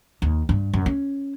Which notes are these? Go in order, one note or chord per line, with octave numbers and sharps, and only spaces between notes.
D#2
G2
F#2
C#4